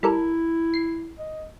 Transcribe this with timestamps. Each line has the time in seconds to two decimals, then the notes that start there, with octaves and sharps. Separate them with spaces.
0.03 G3 E4 A4 A#4
0.74 C7
1.19 D#5